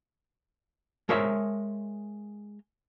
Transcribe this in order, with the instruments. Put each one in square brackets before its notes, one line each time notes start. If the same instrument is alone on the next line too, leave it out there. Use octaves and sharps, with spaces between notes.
[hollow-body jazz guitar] G#3 A#4 C5 C#5 E5